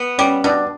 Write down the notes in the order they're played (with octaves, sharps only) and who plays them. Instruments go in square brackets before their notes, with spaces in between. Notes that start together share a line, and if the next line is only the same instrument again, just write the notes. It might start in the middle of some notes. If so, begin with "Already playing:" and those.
Already playing: [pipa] B3
[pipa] G3 [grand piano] C#4
[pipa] B2 [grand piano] D4